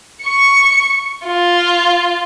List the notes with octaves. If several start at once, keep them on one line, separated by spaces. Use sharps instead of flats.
C#6 C#7
F4